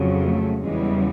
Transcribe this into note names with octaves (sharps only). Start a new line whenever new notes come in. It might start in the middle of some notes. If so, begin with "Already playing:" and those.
Already playing: F2 C#3 F#3
A3
E2 C#3 E3 G3 G#3